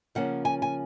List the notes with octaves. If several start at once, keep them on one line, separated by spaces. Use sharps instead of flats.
C#3 F3 A#3 C#4 F#5
G#5
G#5